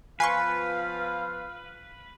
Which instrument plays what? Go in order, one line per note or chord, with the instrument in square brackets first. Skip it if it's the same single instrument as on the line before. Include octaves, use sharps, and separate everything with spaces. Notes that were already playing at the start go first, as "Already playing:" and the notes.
[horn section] F3 B3 F4 [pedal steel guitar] B4 [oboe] F5 [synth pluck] G#5 C6 C#6